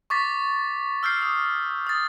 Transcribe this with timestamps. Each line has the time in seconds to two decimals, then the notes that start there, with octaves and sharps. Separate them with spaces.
0.10 C#6 D6 A6 B6
1.03 E6 F6 G6 C7
1.22 D#6
1.87 D#6 A6